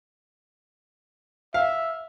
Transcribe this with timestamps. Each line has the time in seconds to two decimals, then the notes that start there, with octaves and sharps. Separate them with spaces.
1.54 E5 F5